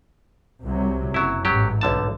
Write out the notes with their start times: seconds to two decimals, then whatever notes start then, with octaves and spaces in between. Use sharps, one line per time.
0.63 C2 C3 F#3
1.14 F#1 F#3 E4
1.45 A1 G#2 F#3 G4
1.81 B1 D3 A5